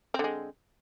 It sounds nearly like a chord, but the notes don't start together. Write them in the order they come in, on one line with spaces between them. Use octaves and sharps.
C4 D3 G#3